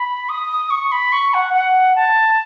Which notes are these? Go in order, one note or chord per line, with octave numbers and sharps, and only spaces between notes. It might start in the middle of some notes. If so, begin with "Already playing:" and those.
Already playing: B5
D#6
C#6
B5
C#6
F#5
F#5
A5